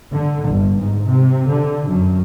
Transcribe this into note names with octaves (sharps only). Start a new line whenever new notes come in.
D3
G1
G#2
C3
D3
F#2